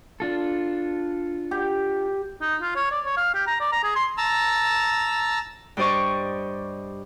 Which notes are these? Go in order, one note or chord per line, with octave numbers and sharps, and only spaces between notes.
D4 F4 A4
G4
D#4
F4
C#5
D5
C#5
F5
G4
A#5
D5
A#5
G#4
C6
A5 A#5 E6
G2 G4 C5 D5 D#5 C#6